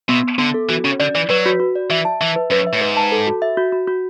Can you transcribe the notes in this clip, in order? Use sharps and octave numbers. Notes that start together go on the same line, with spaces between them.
B2 B3
B3
D3 B3
A4
E3 F#4
C#3 C#4
D3 D5
E3 D5
F#3 B4
F#4
F#4
D5
E3 E5
A5
E3 E5
B4
F#2 B4
E5
A2
G#2 B4
A5
A4
F#4
E5
F#4
F#4
F#4